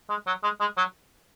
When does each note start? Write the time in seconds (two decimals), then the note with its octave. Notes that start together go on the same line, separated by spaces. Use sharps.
0.10 G#3
0.27 F#3
0.43 G#3
0.60 G#3
0.77 F#3